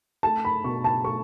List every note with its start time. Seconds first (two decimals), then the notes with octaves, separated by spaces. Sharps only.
0.23 A3 A5
0.45 B5
0.64 B2 C#6
0.84 A5
1.04 A3 C#6